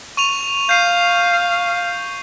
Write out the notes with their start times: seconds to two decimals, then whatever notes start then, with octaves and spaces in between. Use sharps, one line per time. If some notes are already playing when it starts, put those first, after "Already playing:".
0.17 C#6 D#7 F7
0.69 F5 G6 C7 D#7